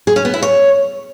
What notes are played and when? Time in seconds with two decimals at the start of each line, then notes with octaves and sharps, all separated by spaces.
0.07 G#4
0.16 C#4
0.25 B3
0.34 E4
0.42 C#5